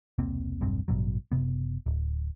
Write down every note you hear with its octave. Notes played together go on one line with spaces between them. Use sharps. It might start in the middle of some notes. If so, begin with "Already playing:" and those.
E1 C2 A#3 C4
E1 B1 G2 C4
A1 G2 B2 F#3
F#1 C3 B3
D1